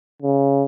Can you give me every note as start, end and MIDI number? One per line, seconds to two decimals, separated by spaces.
0.22 0.64 49